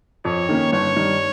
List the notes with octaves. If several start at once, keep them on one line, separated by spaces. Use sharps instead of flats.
F2 C#5
D#3 A#3 C#4
G1 C#5
G2 D#3